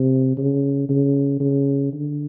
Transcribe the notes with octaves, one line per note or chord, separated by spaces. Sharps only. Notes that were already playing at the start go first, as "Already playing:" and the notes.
Already playing: C3
C#3
C#3
C#3
D3